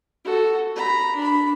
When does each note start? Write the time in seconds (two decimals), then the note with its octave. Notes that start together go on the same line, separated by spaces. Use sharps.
0.25 F#4 A4
0.76 A#5 B5
1.16 D4 B5